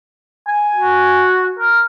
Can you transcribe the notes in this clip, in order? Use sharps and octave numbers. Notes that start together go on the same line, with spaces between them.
G#5
F#4
A#4